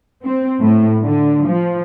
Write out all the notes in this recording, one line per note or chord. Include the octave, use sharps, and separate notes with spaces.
C4
A2
D3
F3